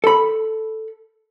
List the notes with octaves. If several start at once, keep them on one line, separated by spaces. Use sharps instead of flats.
A4 B5